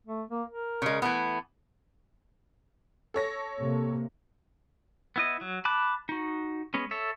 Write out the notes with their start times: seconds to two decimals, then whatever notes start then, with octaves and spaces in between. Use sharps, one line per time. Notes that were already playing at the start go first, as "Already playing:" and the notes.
0.07 A3
0.31 A#3
0.50 A#4
0.82 C#3 G#3
1.02 E3 A3 B3
3.14 A4 C#5 A#6
3.61 C3 A#3
5.16 B3 E4 D#5
5.41 F#3
5.65 A5 B5 D6 F#6
6.09 D#4 F#4
6.74 G#3 B3 C#4
6.91 A4 C#5 E5